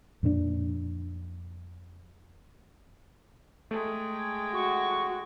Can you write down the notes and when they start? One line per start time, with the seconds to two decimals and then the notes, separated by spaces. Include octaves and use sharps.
0.23 F2 A#2 B3 D4
3.71 G#3 A3 G5
4.54 F#4 C#6